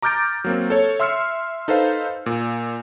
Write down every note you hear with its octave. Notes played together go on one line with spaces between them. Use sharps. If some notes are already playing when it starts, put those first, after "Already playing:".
A#5 D6 F6 G6 A6 D7
F#3 A#3 C4
A4 C#5
E5 C6 E6 F6 C7 C#7
D#4 A4 B4 C5 F5
A#2